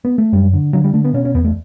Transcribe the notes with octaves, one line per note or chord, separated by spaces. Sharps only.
B3
A3
F#2 G3
D3
D3 F#3
G3
D3 A3
B3
B2 C#4
C#4
E2 B3
A3